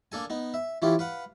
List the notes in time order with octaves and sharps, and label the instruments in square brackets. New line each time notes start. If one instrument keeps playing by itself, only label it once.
[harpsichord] A#3 D4 A4 G#5
B3 D#4
E5
E3 C#4 E4 F4 G4
B4 F5 F#5